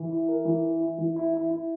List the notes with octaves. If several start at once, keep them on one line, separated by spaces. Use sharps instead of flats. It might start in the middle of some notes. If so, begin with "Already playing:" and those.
Already playing: E3
E4
A#4
E3
E4
E4
E3
E4
E4
E4